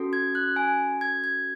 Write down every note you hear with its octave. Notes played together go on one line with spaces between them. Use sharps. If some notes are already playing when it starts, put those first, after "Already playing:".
Already playing: C#4 F#4 A4
G#6
F#6
G#5
G#6
G#6